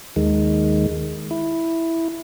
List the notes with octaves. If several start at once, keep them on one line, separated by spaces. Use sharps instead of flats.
D#2 D#3 G#3
E4